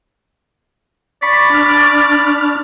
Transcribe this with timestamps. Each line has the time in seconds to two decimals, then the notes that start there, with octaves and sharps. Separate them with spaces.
1.22 D5 B5 C#6 B6
1.50 D4 F6